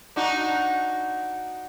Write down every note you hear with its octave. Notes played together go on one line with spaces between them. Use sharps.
D4 D#4 F#4